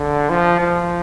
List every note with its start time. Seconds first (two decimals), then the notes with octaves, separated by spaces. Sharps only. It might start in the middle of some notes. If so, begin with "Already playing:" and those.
Already playing: D3
0.29 F3
0.61 F3